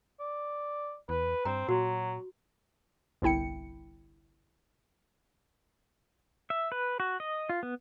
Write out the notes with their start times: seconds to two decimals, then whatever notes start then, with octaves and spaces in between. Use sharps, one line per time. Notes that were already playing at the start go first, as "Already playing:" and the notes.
0.20 D5
1.09 E2 B4
1.45 G2 C4 A#5
1.68 A#2 F#3 F#4
3.22 G1 C2 E4 G5 C#7
6.50 E5
6.72 B4
7.00 F#4
7.20 D#5
7.49 F4
7.63 B3